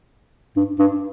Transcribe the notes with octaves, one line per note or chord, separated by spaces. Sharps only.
G2
G2